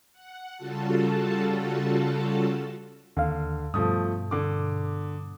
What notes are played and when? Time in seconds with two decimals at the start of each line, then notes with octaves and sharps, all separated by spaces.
0.13 F#5
0.57 C#3 G3 F4 F#4 A4 A5
3.17 D#2 D3 F5
3.74 G2 B2 F3 A3 D#6
4.31 D3 D6